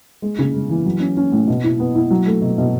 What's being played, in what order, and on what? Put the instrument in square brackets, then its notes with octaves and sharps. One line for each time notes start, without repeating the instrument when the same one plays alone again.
[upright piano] G#3
C#3
G#3
E3
F#3
C#4
C#4
A2
B2
E4
B3
E4
F#3
A3
B2
B2